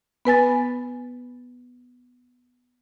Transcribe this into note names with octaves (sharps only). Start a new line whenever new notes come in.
B3 B4 G#5 A6